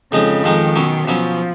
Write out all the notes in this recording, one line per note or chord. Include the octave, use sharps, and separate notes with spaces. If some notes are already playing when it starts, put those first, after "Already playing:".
F2 C#3 F3 G#3 D#4
F2 D#3 F3 G#3 D#4
B2 F#3 C#4
B2 F3 F#3 C#4